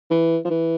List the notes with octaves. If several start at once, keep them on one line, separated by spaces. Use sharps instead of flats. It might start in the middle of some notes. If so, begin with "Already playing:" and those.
E3
F3
E3